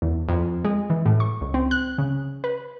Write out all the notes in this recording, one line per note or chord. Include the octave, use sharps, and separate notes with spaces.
E2
F2
G#3
E3
A2
C#6
C#2
C4
F#6
C#3
B4